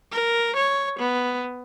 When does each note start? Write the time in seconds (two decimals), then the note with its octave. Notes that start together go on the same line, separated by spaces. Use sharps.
0.12 A#4
0.56 C#5
0.99 B3